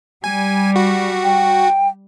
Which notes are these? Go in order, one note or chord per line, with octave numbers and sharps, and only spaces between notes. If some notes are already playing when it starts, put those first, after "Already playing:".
G3 G#5
F#4
G5